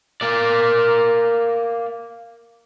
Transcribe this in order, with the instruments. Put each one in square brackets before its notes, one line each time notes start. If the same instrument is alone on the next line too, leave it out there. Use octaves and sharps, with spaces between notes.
[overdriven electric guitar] A#3 D5